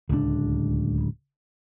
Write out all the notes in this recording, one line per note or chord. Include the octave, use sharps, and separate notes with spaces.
D1 C#2 D#3 D4